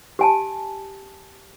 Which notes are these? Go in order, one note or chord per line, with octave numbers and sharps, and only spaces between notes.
G4 G#5 A5